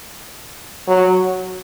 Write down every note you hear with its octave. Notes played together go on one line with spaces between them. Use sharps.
F#3